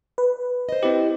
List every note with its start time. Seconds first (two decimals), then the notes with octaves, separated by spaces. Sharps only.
0.18 B4
0.69 C5 D#5
0.83 C4 E4 G4